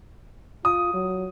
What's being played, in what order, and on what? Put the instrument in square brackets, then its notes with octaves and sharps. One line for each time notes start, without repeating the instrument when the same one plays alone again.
[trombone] F4 [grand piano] D#6
[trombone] F#3